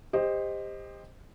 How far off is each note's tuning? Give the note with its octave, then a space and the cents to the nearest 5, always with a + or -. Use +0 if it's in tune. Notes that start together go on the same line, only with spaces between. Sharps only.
G4 +25 C5 +0 D#5 +0